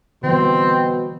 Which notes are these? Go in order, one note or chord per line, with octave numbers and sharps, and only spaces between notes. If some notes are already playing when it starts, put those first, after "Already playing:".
B2 D3 E3 G3 C4